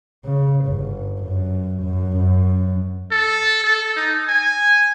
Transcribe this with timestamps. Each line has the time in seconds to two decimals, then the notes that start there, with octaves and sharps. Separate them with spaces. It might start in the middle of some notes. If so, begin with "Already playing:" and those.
0.25 C#3
0.67 G1
1.21 F#2
1.83 F#2
2.17 F#2
3.12 A4
3.64 A4
3.96 D#4
4.28 G#5